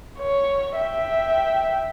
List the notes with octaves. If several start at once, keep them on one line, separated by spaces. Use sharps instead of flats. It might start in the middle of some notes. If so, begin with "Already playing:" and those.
C#5
E5 G5